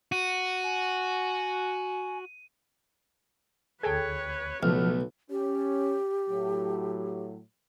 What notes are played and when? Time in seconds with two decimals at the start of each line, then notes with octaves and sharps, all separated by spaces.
0.12 F#4 D#7
0.64 G#5
3.83 D2 G#4 A4 B4 C#5 G5 G#6
4.63 B1 C#3 F3 A3 B3 F6
5.31 C#4 G4
6.29 A2 F#3